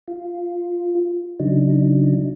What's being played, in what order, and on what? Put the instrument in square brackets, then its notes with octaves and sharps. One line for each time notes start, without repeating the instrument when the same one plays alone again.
[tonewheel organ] F4
C#3 F#3 D4 D#4